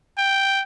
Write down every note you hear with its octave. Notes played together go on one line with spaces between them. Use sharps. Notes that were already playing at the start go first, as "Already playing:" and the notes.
G5